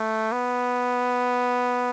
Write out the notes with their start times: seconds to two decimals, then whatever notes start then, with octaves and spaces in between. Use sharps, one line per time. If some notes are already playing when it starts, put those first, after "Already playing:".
Already playing: A3
0.32 B3